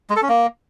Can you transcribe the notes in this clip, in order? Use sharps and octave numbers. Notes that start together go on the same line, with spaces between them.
G#3
A4
C#4
A#3